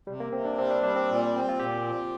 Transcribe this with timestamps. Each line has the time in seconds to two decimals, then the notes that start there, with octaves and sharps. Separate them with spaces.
0.07 C3 G3
0.20 A#3
0.32 C3 C4
0.45 D4
0.58 G3 C4
0.71 D4
0.83 G3 D4
0.96 C4
1.09 A#2
1.33 C4
1.49 F4
1.59 A#2 G4
1.85 F3